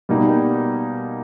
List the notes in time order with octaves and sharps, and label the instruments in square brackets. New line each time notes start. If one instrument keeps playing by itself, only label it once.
[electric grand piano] B2 G3 A#3 D#4